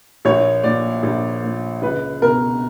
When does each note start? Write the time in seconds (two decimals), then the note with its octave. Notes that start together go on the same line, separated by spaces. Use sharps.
0.25 A#1 C#5
0.64 A#2 D5
1.03 A#1
1.44 A#2
1.82 C#2 B4
2.22 B2 A#4